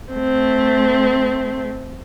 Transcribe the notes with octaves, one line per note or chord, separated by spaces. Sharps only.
A3 C4